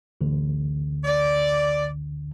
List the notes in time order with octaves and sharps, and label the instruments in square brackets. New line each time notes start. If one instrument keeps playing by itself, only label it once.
[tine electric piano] A1 D2 D3
[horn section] D5